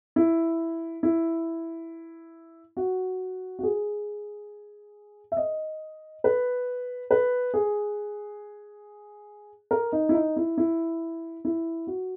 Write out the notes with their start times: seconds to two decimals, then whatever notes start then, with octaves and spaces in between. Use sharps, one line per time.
0.16 E4
1.03 E4
2.77 F#4
3.59 F#4
3.63 G#4
5.32 E5
5.37 D#5
6.24 B4
7.11 B4
7.54 G#4
9.71 A#4
9.92 D#4
10.09 E4
10.14 D#4
10.36 E4
10.58 E4
11.45 E4
11.87 F#4